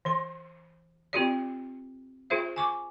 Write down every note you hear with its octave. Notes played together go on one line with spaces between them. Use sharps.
E3 C6
C4 F4 G4 D5
F4 G#4 C5 E5
G#5 C#6 D6